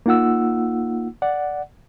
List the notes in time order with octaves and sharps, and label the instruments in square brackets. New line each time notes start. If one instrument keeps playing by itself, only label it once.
[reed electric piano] A#3 D#4 F4 F#5 E6
D5 F#5